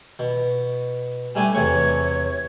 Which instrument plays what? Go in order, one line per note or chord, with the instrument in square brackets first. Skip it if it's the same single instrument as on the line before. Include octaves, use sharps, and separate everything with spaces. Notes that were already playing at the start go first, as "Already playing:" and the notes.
[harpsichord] B2
[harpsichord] G3 A3 D4 [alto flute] G#5
[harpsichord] E2 C3 C#6 [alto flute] C#5